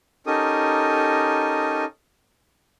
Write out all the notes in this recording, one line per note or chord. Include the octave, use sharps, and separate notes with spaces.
C#4 D#4 G4 A4 A#4 D#6